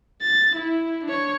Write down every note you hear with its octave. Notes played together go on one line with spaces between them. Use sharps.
A6
E4
D4 C#5